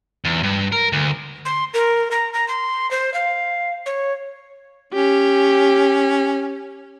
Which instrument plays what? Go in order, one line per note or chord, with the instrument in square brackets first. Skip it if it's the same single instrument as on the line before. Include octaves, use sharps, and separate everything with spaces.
[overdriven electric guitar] E2
G2
A#4
D2
[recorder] C6
A#4
A#5
A#5
C6
C5
F5
C#5
[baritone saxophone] C#4 [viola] G4